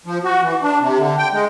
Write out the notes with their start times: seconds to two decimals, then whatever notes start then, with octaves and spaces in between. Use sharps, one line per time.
0.06 F3
0.24 F#4
0.43 E3
0.63 D4
0.80 C3
0.98 D3
1.18 G5
1.33 G#3